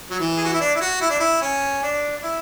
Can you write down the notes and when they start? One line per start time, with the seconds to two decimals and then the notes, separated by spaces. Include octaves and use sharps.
0.10 F#3
0.20 E3
0.37 G#4
0.45 F#4
0.53 E4
0.61 D4
0.75 E4
0.81 F#4
1.01 E4
1.10 D4
1.20 E4
1.42 C#4
1.83 D4
2.17 D4
2.23 E4